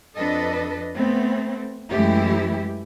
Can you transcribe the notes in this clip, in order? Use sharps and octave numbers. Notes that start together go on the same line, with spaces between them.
F2 D4 A4 B4 D#5
A3 B3 C4
F#2 E3 G#3 A3 E4 G4